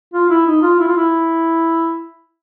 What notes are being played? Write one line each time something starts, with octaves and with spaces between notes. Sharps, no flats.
F4
E4
D#4
F4
E4
F4
E4